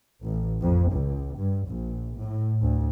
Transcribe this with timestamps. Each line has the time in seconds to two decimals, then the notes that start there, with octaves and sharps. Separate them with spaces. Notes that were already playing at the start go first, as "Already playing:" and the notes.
0.24 A1
0.62 F2
0.93 C#2
1.37 G2
1.68 A#1
2.19 A2
2.61 D2